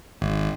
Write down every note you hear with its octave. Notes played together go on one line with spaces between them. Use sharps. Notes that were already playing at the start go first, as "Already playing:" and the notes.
G#1